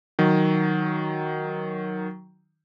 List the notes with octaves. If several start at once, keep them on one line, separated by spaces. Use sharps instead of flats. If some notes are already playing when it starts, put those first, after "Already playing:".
D#3 F#3